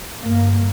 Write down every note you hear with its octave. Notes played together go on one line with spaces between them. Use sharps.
G1 G2 A#3